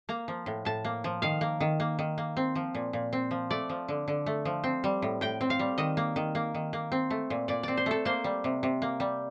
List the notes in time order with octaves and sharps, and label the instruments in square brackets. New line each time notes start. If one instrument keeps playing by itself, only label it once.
[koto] A#3 A#5
F3
A2
A2 A5
A#3
F3
D#3 F5
A#3
D#3
A#3
D#3
A#3
C4
F3
A#2
A#2
C4
F3
A3 D5
F3
D3
D3
A3
F3
C4
G3
A2
A2 G5
C4
F5
G3
D#3 D#5
A#3
D#3
A#3
D#3
A#3
C4
A3
A#2
A#2 D5
C4 D5
C5
A3 A4
A#3 C5
G3
C3
C3
A#3
G3